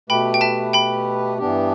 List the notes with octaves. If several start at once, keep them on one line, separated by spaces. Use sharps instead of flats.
B2 A3 G4 B4 G5 B5
G5
E5 A5
G5 B5
G2 E3 B3 D4 G4